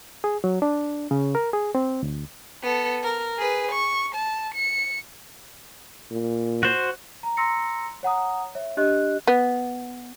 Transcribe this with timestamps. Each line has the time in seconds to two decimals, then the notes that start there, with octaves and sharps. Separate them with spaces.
0.24 G#4
0.44 F#3
0.62 D4
1.11 C#3
1.35 A#4
1.53 G#4
1.75 C4
2.03 D2
2.63 B3 A4
3.03 A#4
3.38 G#4 B4
3.71 C#6
4.15 A5
4.55 C#7
6.11 A#2
6.63 F#4 C5
7.23 A#5
7.37 A#5 C6 E6 A#6 C#7
8.03 C#5 F#5 A#5 D#6
8.55 C#5 E5
8.77 D4 G4 D#5 F#6
9.27 B3